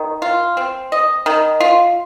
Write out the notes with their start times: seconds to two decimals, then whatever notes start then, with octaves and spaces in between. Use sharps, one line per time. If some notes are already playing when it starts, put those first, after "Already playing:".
Already playing: D#3
0.22 F4
0.57 C4
0.92 D#5
1.26 D#3
1.60 F4